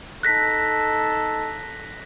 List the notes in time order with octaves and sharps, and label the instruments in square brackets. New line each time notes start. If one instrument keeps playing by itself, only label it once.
[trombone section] D#4 A4 [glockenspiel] F#6 A#6 B6